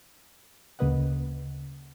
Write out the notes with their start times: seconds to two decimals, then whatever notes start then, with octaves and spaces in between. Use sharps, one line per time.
0.79 D2 C#3 A#3 B4 D#5 F#5